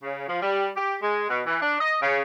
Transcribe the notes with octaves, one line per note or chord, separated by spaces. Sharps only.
C#3
F3
G3
G4
G#3
B2
E3
D4
D#5
C#3